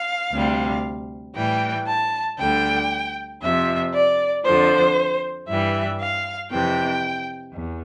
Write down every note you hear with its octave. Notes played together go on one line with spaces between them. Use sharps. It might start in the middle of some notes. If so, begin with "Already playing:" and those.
Already playing: F5
D2 C3 G3
A2 E3 G3 G5
A5
D2 D3 G3 G5
F2 C3 F3 E5
D5
F2 D3 F3 C5
G2 E3 G3 E5
F5
F2 C3 E3 G5
E2